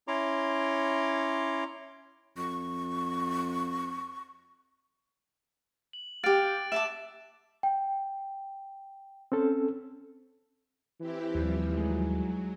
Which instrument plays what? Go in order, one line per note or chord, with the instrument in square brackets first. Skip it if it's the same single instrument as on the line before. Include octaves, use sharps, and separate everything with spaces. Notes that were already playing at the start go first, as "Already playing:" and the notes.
[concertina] C#4 E4 C#5 A#5 C6 D6
[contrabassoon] F2 [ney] C#6
[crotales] F#7
[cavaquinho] G4 F5 [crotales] F#6 A6 D7
[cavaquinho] E5 A5 D6 [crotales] E7
[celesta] G5
[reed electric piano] C4 C#4 A4
[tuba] E3 [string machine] C4 E4 G4
[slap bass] D#2 [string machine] F3 G3
[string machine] F#3 [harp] G#3 D#4 G#4